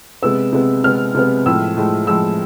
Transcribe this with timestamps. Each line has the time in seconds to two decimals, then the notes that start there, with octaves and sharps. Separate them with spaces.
0.22 C3 G#3 B3 E6
0.53 C3 G#3 B3
0.83 C3 G#3 B3 F6
1.15 C3 G#3 B3
1.46 A2 F3 G#3 E6
1.77 A2 F3 G#3
2.07 A2 F3 G#3 E6